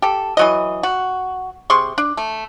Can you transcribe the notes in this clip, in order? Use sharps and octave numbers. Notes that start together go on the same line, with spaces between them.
G4 A4
E3 F#3 D#5
F#4
C3 G#4 C6 C#6
D4
A3